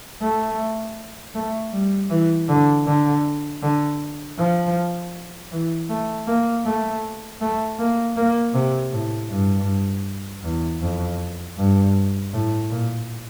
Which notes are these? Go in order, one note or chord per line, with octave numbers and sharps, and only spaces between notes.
A3
A3
G3
E3
D3
D3
D3
F3
E3
A3
A#3
A3
A3
A#3
A#3
C3
A2
G2
E2
F2
G2
A2
A#2